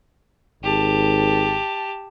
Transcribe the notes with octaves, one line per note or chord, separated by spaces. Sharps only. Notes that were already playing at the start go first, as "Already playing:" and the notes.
G#1 G4 A5